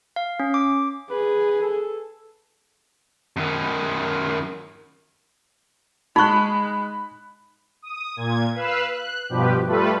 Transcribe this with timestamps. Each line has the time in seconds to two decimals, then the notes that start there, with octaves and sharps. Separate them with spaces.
0.16 F5
0.40 C#4
0.54 D6
1.11 G#4 B4
1.62 A4
3.37 F#2 D#3
6.16 G#3 D#4 B5 C#6 F#6
7.82 D#6
8.16 A#2 G#6
8.54 B4 F5 E6 F#6
8.92 F#6
9.29 G2 B2 F3 G4 B4
9.66 G3 A3 F4 A4 B4